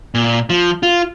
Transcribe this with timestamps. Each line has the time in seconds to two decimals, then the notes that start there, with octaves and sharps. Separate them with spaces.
0.14 A#2
0.50 F3
0.83 F4